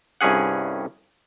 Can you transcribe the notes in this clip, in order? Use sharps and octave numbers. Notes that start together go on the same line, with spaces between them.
C2 G2 C#4 G#4 F#5